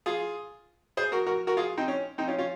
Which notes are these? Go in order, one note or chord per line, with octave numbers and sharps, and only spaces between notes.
F4 G#4
G#4 C5
F#4 A#4
F#4 A#4
F#4 A#4
F4 G#4
C4 D#4
C#4
C4 D#4
C#4 F4
C#4 F4